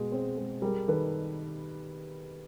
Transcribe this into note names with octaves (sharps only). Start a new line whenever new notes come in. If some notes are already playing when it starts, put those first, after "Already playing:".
Already playing: B2 G#3
C4
G#3
G3 G#4 A#4
D#3 A4 B4